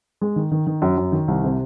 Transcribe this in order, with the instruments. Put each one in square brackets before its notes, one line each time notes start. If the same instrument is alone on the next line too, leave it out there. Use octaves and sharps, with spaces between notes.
[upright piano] G#3
D#3
D#3
D#3
F#2
F#2
D#3
C2
C3